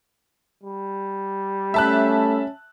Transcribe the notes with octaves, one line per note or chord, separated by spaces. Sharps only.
G3
A3 C#4 E5 A5 F#6